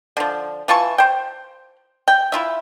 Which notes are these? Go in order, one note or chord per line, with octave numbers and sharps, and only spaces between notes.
D3 F3
E3 F4 A5 C#6
C5 G5
G5
E4 F4 E5